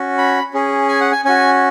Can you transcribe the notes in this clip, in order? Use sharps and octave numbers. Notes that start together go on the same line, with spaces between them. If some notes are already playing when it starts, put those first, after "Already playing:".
Already playing: C#4 F#4
B5
C#4 G#4
G#5
F#5
G#5
C#4 F#4 G#5